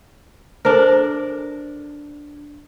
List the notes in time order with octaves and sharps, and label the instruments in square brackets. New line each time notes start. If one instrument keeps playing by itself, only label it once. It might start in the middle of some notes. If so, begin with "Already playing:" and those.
[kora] D4 A#4 [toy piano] A4 C5